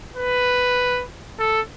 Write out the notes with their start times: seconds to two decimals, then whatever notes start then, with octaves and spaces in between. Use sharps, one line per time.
0.17 B4
1.39 A4